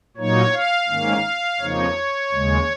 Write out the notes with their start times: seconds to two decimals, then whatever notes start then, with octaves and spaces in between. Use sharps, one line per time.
0.17 A#2 F#3 A#3 D#4 C#5
0.53 F5
0.89 G#2 D#3 A#3 C#4
1.60 F2 C#3 F3 A#3 D#4 C#5
2.32 D#2 C#3 G#3